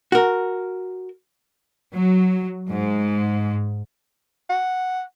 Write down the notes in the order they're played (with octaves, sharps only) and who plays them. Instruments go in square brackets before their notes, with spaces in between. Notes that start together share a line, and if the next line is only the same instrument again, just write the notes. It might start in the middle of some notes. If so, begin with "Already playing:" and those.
[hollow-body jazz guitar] F#4 A#4
[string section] F#3
G#2
[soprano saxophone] F#5